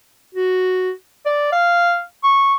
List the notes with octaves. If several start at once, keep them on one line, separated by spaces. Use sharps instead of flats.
F#4
D5
F5
C#6